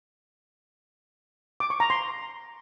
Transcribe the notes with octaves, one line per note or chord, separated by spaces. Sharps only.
D6
C#6
A#5
C6